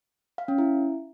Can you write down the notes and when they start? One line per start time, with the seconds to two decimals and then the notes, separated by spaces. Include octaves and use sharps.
0.38 F5
0.48 C#4
0.58 E4